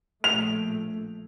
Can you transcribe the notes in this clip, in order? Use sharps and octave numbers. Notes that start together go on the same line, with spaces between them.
A#1 A3 F7